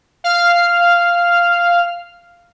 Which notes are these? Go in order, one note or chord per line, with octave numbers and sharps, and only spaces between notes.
F5 F6